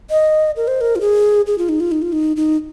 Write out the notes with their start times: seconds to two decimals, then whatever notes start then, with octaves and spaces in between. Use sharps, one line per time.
0.10 D#5
0.56 A#4
0.68 C5
0.81 A#4
0.96 F4
1.01 G#4
1.47 G#4
1.58 F4
1.69 D#4
1.80 F4
1.92 D#4
2.02 F4
2.13 D#4
2.37 D#4